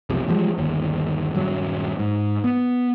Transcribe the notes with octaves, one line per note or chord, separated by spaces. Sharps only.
E1 B1 F2 C3
E3 F3 G3 G#3
G1 D#2
D#1 G2 F#3
G#2
B3